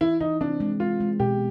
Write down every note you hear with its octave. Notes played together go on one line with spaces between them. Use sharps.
E3 E4
E3 D#4
C4 D4
G#3
G#3 F4
G#3
B2 G4